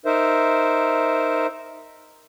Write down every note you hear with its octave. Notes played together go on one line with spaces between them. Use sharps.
D#4 A#4 C5 E5